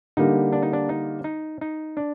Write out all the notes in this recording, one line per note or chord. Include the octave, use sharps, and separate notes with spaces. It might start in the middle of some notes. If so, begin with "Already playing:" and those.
D3 G3 A#3 D#4
D4
D#4
D4
D#4
D#4
D#4
D4